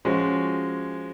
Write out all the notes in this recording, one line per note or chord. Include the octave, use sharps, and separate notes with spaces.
F3 G#3 C#4 F#4